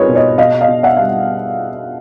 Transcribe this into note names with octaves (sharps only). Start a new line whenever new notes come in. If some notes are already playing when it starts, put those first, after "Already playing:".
Already playing: G3 C4 D#4 F4 G#4 A#4 B4 C#5
B2
C#5 D#5
B2 D#5 F5
D#5 F5
B2
E5 F#5
G3 F5